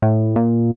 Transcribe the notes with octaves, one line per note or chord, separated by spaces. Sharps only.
A2
A#2